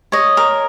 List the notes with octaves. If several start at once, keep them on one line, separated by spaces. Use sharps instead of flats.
C#5 D#5
A#4